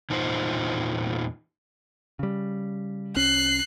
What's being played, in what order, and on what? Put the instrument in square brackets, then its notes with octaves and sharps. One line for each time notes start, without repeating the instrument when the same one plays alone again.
[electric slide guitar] E2 A#2 D#4 F4 C5
[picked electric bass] C#3 G3
[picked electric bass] C2 C#4 [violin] F#6 C7